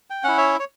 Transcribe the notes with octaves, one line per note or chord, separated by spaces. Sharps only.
G5
C#4 E4 F#5
C#5 E5
C#5